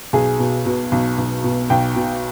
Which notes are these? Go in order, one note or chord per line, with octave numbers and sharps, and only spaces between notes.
B1 G#4
B2
B2
B1
B1
B2
B1 G5
B2